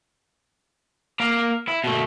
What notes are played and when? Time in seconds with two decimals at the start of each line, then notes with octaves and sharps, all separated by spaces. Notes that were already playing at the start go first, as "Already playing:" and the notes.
1.20 A#3 F5
1.68 E4
1.84 B2 A3